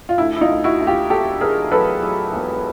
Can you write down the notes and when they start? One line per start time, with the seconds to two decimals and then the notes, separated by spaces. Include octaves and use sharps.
0.09 F4
0.18 D2 E4
0.36 E4
0.41 D#4 F4
0.49 D2
0.64 E4 F#4
0.80 D2
0.87 F4 G4
1.10 E1 G4 A4
1.41 E1 G#4 A#4
1.72 F#3 A4 B4
2.02 F#3
2.33 E1